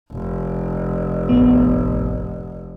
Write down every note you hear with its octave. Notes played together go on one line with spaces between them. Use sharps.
F1
A1 A2 B3